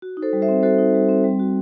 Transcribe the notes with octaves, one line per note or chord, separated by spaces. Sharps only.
F#4
D#4
A4 C5
G3
C5 E5
C4
F#4 A4 C5
D#4
G3
C4
G3
F#4